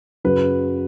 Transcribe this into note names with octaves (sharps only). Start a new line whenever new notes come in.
F#2 C#3 F#3 B4